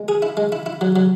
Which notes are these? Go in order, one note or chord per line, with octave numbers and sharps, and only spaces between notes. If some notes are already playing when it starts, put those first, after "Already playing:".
Already playing: G#3
G#4
E4
G#3
E4
E4
F#3
F#3